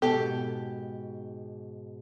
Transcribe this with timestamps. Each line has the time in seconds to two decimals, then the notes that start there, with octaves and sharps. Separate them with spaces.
0.02 G#2 B2 G4 A4